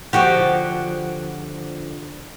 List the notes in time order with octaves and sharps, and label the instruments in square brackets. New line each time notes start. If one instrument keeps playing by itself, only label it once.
[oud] D3 F3 [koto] F#4 G4